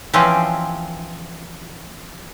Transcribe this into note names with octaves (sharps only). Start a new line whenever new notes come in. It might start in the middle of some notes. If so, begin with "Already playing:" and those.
E3 F3 C4 C#4